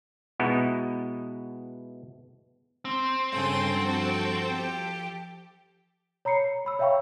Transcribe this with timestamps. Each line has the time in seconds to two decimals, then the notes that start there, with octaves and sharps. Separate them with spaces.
0.40 B2 G#3 B3 D#4 E4
2.85 C4
3.33 G2 C#3 A4 G5 G#5 C6
3.74 F3 F#4
4.56 F3 G4
6.25 C#5 A#5 B5 C7 C#7
6.65 C#5 B5 E6
6.79 C#5 E5 F5 G5 B5 C#6